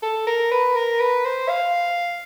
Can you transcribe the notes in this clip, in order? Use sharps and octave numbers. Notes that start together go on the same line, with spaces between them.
A4
A#4
B4
A#4
B4
C5
F5